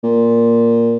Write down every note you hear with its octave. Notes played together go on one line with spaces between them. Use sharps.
A#2